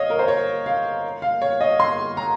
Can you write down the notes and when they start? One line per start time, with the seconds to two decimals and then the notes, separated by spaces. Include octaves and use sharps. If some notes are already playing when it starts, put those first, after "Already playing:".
Already playing: C#5 D#5 F5
0.10 A#4
0.19 C5
0.28 C#5
0.66 F5
1.22 F5
1.42 C#5
1.61 D#5
1.80 C6
2.17 A#5